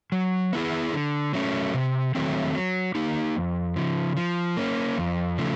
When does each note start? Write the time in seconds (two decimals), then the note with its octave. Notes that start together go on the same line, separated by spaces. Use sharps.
0.12 F#3
0.53 B3 E4 G#4
0.93 D3
1.33 F#3 A3 C#4
1.74 C3
2.15 D#3 F#3 A3 C4
2.55 F#3
2.95 A#3 D#4 G4
3.36 F2
3.76 C#3 F3
4.17 F3
4.57 A#3 C#4
4.98 F2
5.38 C#3 F3 A3